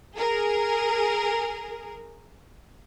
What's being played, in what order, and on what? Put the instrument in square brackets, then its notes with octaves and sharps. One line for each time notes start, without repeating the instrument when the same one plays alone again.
[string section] G#4 A#4